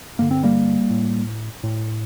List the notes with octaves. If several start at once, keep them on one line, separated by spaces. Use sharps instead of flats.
G2 D3 A#3
C4
G3 A#3
A2
A2